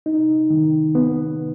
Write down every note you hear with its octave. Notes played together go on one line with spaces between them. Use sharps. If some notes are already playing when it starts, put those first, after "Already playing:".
D#4
D#3
B3